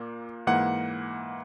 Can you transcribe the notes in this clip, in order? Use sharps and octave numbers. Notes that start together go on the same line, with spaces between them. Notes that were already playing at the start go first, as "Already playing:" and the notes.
Already playing: A#2 A#3
G#2 E3 A#3 F#5